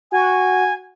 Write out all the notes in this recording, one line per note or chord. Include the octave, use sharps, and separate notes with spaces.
F#4 G#5